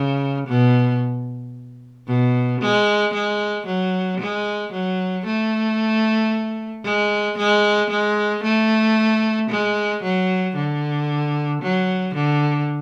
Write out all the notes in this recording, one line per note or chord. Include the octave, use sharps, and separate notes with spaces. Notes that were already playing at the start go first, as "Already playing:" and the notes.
Already playing: C#3
B2
B2
G#3
G#3
F#3
G#3
F#3
A3
G#3
G#3
G#3
A3
G#3
F#3
D3
F#3
D3